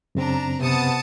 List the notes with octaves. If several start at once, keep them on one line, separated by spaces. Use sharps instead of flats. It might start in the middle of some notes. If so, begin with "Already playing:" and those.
F#2 C#3 C4 D4 A#5
C3 B3 A5 D#6 C#7